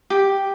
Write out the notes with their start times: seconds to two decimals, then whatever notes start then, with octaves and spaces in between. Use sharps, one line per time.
0.10 G4